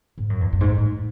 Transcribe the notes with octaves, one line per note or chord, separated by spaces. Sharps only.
G#2
F#2
E2
F#2
G#2
A2